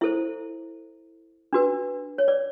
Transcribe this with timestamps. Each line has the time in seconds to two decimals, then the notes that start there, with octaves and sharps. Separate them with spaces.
0.01 E4 A4 C5 E5
1.53 D4 F#4 B4
2.18 C#5
2.28 D5